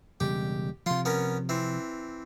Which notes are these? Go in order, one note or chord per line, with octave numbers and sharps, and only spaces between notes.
E1 C#3 G3 G4
C3 F3 F4 C6
B3 C#4 A#4
E3 C4